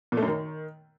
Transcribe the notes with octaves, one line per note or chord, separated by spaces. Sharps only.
A#2
A3
F#2
D#3